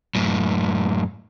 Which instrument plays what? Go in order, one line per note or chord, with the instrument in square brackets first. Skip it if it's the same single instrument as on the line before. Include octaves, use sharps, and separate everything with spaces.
[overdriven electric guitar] F#2 A2